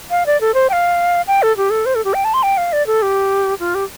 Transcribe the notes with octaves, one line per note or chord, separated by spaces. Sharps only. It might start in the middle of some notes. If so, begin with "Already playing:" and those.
F5
D5
A4
C5
G5
F5
G5
A4
G4
A4
C5
A4
G4
G5
A5
C6
G5
F5
D5
A4
G4
F4
G4